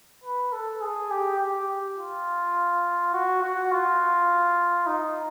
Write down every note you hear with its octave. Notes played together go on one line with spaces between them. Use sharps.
B4
A4
G#4
G4
G4
F4
F#4
F#4
F4
D#4